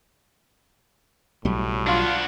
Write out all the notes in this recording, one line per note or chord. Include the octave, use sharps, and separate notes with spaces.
B1 A2 F#3 G3
D4 F4 F#4